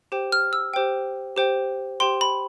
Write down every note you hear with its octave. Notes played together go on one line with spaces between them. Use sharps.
G4 C5 G5
F6
E6
G4 C5 G5
G4 C5 G5
G4 C5 G5 C6
B5